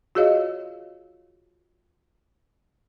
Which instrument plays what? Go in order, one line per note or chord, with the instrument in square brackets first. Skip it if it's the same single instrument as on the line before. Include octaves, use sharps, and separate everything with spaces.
[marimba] F4 F#4 G#4 C#5 D#5 F5